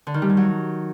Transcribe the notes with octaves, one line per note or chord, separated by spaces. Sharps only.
D3
D#3
G3
G2
F#3